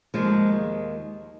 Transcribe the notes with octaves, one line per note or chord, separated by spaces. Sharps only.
D#2 D#3 F3 G#3